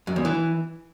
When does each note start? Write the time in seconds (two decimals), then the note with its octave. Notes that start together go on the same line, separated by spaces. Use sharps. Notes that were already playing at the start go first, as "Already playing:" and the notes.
0.07 F#2
0.16 E2
0.25 E3